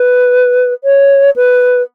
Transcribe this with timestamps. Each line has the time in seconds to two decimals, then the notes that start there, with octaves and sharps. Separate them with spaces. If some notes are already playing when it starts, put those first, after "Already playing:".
Already playing: B4
0.84 C#5
1.36 B4